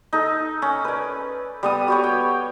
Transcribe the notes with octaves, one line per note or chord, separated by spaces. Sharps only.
D#4 A4
C#4
B4 D5
G3 B3 D#6
F#4 G4 C#5
G5